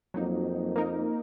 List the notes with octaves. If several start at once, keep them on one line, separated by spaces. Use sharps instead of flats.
F2 F#3 A#3 D#4
A#3 D#4 A#4